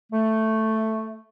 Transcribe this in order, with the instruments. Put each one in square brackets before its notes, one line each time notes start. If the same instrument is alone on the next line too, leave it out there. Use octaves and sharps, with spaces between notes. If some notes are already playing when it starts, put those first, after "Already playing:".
[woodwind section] A3